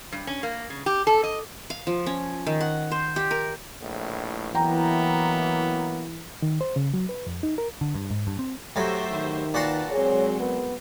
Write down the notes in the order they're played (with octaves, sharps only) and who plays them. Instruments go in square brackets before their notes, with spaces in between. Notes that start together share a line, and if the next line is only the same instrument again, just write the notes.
[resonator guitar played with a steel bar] G2
C#4
A#3
C#3
G4
A4
D#5
[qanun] F5
F3
C#4
D#3
F#5
C5
G4
A#4
[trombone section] A#1 A2
[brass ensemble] E3 [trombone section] F#3 A#3 B3 [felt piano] G5 A#5
[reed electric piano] D#3
C5
C#3
F#3
B4
F2
D#4
A#4
[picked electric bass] D3
G2
G#2
G2
C4
[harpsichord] A2 F#3 [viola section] G4 C5 E5
[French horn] D#3
[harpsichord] A#2 F#4 C6 [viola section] B4 F#5 A5
[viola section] F#3 G#3 C4 [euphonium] G#4 [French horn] C#5
[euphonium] B3 [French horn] A#4